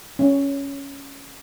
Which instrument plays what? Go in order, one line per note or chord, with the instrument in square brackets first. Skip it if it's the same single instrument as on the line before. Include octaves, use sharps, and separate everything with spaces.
[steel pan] C#4